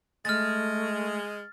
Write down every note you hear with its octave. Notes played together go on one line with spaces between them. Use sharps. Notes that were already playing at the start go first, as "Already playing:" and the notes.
G#3 A3 F6 A6